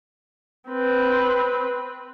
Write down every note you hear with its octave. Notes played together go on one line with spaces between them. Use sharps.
C4 B4